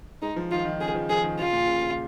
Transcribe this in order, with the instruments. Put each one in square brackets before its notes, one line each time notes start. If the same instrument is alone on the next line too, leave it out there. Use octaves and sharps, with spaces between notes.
[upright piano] G#3 [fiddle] D#4
[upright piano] F3
[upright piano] D#3 [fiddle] F4
[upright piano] D#3
[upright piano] C#3 [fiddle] G#4
[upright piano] F3
[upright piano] F3 [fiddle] G#4
[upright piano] D#3
[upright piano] C#3 [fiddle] F4
[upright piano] A#2
C#3
C#3